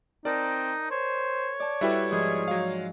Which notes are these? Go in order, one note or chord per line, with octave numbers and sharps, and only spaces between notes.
C4 D#4 A#4 D5 A5 A#5
C5 C#5
D5 A5
G3 E4 F#4 A4 B4 E5 G5
G#2 F3 G#4
F#3 F5